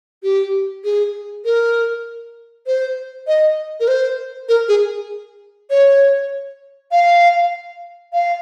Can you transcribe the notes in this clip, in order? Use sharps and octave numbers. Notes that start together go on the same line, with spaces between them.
G4
G#4
A#4
C5
D#5
A#4
C5
A#4
G#4
C#5
F5
F5